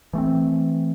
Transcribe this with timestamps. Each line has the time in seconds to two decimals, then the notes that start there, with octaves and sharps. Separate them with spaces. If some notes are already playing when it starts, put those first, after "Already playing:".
0.13 E3 A3 C4